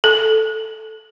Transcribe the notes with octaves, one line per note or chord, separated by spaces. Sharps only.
A4